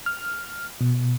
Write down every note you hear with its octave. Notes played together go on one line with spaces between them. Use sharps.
F6
B2